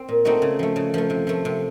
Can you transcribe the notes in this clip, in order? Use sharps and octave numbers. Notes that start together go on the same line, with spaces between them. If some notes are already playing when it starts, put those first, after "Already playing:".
Already playing: C4
A#2
A3 C4 D#4 F#4
C#3
F3 A3
C#3
F3 A3
C3
F3 A3
C3